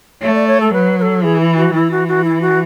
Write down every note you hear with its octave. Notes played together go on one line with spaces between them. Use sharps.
A3 C#5
D5
C#5
A4
F#3 B4
B4
A4
E3 G#4
E4
F#4
E3 E4
F#4
F#4
E4
F#4